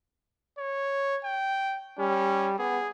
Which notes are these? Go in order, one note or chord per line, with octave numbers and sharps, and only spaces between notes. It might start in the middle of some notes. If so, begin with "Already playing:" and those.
C#5
G5
G3 C#4
B3 G#4